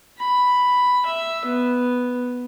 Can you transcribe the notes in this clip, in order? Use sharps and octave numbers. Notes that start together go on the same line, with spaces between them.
B5
E5
B3